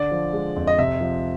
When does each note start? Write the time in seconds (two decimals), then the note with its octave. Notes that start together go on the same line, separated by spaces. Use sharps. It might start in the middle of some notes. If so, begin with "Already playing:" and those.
Already playing: D3 D5
0.11 F3
0.33 G#3
0.56 F2
0.67 D#5
0.78 C3 E5
1.01 F3